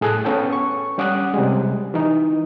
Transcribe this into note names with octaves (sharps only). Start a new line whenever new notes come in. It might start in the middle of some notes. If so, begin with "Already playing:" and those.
A2 G#4 A4 F#6
B3 C#4 A4 C#5 G5
C#6
G3 C#4 F#5 D6 D#6 F#6
C3 G3 G#3
E3 D#4